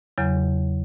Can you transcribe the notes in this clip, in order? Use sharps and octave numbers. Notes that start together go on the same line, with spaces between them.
E2 C#3 F#3